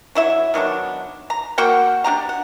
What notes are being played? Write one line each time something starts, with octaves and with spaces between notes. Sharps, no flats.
F#3 E4 E5
D#3 F#3 B3 D4
A#5
A#3 F#4 F#5 G5
D4 D#4 G4 A#5
F#5